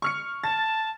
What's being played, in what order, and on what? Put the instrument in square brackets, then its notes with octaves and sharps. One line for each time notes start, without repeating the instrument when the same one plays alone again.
[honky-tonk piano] C#6 F6 C#7
[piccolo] A5 [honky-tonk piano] A6